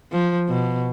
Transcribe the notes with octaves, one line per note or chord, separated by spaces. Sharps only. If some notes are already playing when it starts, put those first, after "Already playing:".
F3
B2